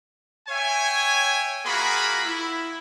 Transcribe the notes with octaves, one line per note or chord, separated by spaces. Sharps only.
C#5 E5 G5 G#5
A#3 F4 F#4 G#4 B5
E4